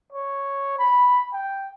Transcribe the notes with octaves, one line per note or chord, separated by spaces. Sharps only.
C#5
B5
G5